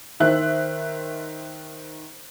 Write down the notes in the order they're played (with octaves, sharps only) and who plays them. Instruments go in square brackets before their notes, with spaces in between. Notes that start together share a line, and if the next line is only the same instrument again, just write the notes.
[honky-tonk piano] D#3 C5 E5 F#6